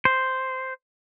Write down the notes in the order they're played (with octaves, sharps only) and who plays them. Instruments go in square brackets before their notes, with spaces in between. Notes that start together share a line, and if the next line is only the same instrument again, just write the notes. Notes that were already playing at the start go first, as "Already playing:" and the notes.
[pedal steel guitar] C5